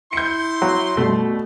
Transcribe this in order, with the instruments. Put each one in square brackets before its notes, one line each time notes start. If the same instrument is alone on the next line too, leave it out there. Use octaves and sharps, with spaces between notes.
[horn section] E4 C6 [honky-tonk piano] G6 C#7
[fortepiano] F#3
[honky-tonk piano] B2 G3 [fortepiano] A3